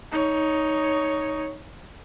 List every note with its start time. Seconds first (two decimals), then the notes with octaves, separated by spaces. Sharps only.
0.11 D#4 C#5